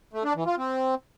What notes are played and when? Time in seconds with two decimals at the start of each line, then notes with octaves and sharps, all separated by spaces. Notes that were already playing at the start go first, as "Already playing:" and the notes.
0.13 A3
0.24 D4
0.36 E3
0.47 F4
0.58 C4